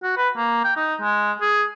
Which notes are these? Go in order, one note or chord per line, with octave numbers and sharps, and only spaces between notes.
F#4
B4
A#3
G5
D#4
G#3
G#4